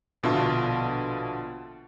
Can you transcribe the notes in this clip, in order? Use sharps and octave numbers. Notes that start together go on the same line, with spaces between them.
A#1 B2 D3 F4 E5 A5